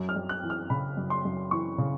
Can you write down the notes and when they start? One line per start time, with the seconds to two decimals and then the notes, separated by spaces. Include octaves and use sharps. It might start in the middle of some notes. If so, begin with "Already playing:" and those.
Already playing: F#2
0.09 F6
0.16 F#2
0.29 F#6
0.43 E3
0.50 F6
0.70 C#3 B5
0.97 F#2
1.10 C6
1.25 F#2
1.51 E3 C#6
1.78 C#3